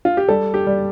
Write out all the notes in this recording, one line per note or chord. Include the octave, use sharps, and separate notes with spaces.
F4
G4
G3 A4
G4
G3